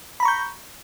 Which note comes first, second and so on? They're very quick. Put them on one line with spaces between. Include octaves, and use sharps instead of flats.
B5 A#5 C#6 G6